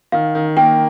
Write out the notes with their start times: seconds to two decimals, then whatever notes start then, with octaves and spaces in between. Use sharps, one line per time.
0.12 D#3 F5
0.35 D#3
0.57 A#3 G5